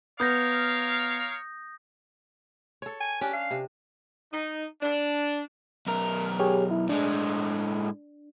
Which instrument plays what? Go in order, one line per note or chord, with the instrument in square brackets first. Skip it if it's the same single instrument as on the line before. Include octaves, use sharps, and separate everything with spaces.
[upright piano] B3 [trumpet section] A#4 C#5 F5 [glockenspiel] D#6 G6 A#6
[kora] A4 C#5
[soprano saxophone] G#5
[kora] C#4 D4 [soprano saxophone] G4
[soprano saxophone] F5
[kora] C3
[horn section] D#4
D4
[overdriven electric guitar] B1 A#4
[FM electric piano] G4 G#4 C#5
E4
[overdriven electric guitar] A2 G#3 [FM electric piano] D4